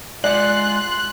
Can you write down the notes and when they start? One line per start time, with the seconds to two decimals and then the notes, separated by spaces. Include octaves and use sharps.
0.24 G#3 F4 D5 F#5 C6 F#6